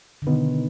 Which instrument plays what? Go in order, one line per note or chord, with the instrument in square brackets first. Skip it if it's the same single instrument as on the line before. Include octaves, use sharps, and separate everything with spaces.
[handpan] D3
[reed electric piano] B2 B3 D#4 B4 [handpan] D#3